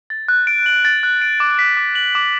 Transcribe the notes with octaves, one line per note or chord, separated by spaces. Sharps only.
A6
F#6
D7
F#7
A6
F#6
D7
D6
B6
D6
F#7
D6